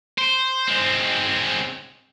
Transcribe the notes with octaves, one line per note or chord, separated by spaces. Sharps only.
C5
G#3 C4